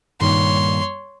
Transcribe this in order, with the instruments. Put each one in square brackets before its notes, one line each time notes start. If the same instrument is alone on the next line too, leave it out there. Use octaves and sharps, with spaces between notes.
[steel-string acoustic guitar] G2 A#2 D#3 [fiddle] C#5 C6